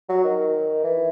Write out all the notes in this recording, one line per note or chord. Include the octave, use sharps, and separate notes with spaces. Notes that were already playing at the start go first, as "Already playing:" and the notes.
F#3
D#3
E3